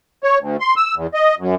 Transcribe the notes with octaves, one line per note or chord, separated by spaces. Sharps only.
C#5
D2
C6
E6
E2
D#5
F#2